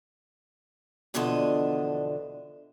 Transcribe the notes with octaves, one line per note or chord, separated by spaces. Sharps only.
E2 B2 D3 F3 D4 D#5